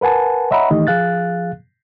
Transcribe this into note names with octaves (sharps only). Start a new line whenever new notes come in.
A#4 B4 F#5 G#5 A5
C#5 D#5 E5 F#5 A#5 B5
D#3 E3 A3 D#4 G4 D#5
F3 G#4 F5 F#6 A6